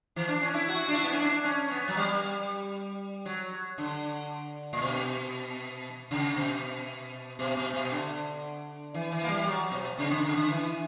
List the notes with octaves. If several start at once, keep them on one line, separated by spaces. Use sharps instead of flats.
E3
D4
C#4
E4
F#4
D4
E4
B3
C#4
D4
C#4
B3
F#3
G3
F#3
D3
A#2
B2
C#3
B2
B2
B2
B2
D3
E3
E3
A#3
G3
F#3
B2
C#3
D3
C#3
D3
E3